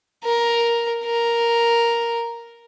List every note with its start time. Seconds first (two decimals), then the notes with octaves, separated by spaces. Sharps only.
0.24 A#4
1.05 A#4